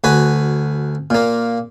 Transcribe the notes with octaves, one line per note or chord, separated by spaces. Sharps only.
D2 F#4 B4 G#5
A#2 A#3